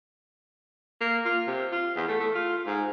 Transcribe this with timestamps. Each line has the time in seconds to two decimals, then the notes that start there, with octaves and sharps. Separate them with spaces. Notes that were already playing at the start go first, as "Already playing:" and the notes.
1.01 A#3
1.25 F4
1.47 C3
1.72 F4
1.96 E2
2.08 A3
2.20 A3
2.35 F4
2.66 G#2